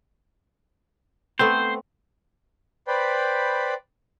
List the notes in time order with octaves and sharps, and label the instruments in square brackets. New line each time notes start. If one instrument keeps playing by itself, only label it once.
[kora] A3 B3 C4 [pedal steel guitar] C5
[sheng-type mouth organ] B4 C5 D5 G5 B5